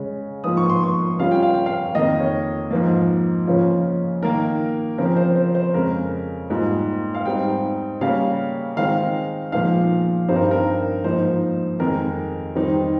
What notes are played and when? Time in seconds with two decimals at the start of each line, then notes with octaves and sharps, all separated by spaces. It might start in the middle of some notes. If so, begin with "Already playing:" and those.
Already playing: C#3 G#3 C#4
0.44 G#2 F3 A#3 F4 D#6
0.57 C#6
0.70 C6
0.84 C#6
1.19 C#3 G3 C#4 F4 F5
1.31 G5
1.42 F5
1.54 G5
1.66 F5
1.95 F2 D#3 A#3 D#5
2.20 C#5
2.71 G#2 F3 A#3
3.47 C#3 F3 A#3 C#4 F4
4.22 D#3 A#3 D#4 A#4
4.98 C#3 F3 C4 A#4
5.16 C5
5.36 C5
5.55 C5
5.74 F2 C#3 G#3 A#4
6.50 G#2 G3 A#3 F4
7.14 F5
7.25 G#2 G3 C4 D#4 G5
8.01 C#3 G3 A#3 C#4 F5
8.76 D#3 G#3 C4 D#4 F5
9.52 A#2 F3 G#3 D#4 F5
10.28 G2 G3 C4 D#4 C5
10.36 A#4
10.51 A#4
11.04 G#2 F3 A#3 D#4 C5
11.80 F2 D#3 G#3 D#4 A#4
12.56 F2 D#3 G3 C4 D#4